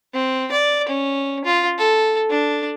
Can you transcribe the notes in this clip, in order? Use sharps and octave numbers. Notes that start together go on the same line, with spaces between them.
C4
D5
C#4
F4
A4
D4